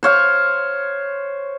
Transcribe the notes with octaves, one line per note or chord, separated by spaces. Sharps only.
C5 C#5 F5